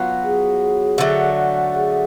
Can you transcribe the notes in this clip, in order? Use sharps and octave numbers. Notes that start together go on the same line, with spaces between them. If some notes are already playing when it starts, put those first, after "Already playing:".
Already playing: F#3 B3 F4
G#4
D3 F#3 A3
G#4